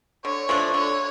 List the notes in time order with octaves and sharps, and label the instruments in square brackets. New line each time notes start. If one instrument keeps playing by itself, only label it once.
[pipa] D3 [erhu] C#5
[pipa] F3 A3 D4
[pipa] D3 [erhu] C#5